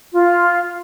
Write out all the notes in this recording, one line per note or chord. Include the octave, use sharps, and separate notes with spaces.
F4